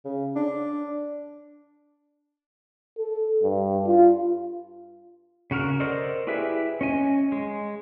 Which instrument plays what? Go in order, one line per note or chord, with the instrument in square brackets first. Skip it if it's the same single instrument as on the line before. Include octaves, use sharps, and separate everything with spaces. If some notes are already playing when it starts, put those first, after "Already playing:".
[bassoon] C#3
D4
[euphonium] A4
G2
F4
[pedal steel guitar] C#3 F#4 A#4 F6
A4 A#4 C5 D5 D#5
E4 G4 G#4 B4 E5
C#4 D#5 G#5
G#3